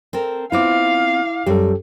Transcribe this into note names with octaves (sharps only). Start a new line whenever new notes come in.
C4 A4 A#4
B3 C4 E4 F4 F5 D6
F#2 G3 G4 A4